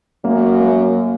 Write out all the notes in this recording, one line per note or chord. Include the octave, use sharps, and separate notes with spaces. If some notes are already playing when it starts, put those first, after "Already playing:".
F#2 A#3
A#3